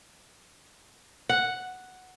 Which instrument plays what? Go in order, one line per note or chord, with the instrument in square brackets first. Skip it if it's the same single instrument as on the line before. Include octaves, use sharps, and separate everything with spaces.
[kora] F#5